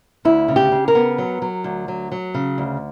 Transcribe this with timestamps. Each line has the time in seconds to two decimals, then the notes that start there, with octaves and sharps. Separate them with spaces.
0.25 D2 E4
0.48 C#3
0.56 G4
0.72 C#3
0.88 A#4
0.95 B3
1.18 F#3
1.42 F#3
1.64 D2
1.88 F#3
2.12 F#3
2.34 C#3
2.58 D2